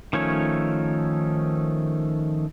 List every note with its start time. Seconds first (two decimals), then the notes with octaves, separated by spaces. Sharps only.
0.13 D#3 F3 A3 C#4 C#5